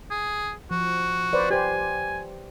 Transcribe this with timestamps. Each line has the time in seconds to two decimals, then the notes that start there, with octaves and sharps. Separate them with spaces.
0.11 G#4
0.71 F3 F#4
1.33 B4 C5 D5
1.50 G4 C5 G#5